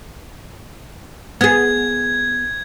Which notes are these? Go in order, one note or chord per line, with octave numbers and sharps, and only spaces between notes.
B3 G#4 G#6